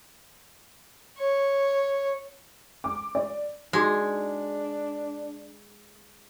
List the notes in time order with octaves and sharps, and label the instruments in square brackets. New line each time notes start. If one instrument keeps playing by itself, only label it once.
[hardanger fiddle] C#5
[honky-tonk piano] D6
D5
[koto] G#3 [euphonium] D4 [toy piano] D#4 F#4 G#4